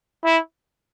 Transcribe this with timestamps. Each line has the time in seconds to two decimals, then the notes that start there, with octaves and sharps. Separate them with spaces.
0.25 E4